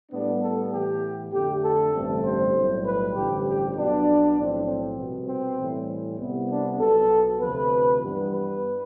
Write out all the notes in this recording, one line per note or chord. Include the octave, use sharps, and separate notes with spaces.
A2 G3 B3 D4
A4
A2 E3 B3 G4
F2 D3 A3 G4
A4
A1 G2 D3 A3 C4
C5
B1 A2 G3
B4
A1 G2 D3 F3 G4
G4
B1 B2 B3 D4
B1 A2 F3 C4
C4
C2 B2 B3
C4
A2 E3 G3
C2 C3 G3 B3
D4
B1 B2 B3 A4
D2 C3 F3 B4
G2 E3 B3
B4